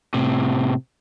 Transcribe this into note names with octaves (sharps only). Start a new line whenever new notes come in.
A2 C3